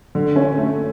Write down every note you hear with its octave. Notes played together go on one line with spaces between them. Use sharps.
D3
C#4
A3